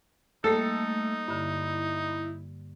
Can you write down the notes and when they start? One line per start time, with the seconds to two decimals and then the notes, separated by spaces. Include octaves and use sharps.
0.44 G3 A3 A#3 D#4 A4
1.28 G2 D3 E4